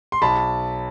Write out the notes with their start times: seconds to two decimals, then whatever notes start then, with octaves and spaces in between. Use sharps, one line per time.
0.12 C6
0.22 B1 A5 B5